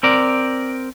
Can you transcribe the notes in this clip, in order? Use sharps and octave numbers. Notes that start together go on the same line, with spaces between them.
C4 A#4 D5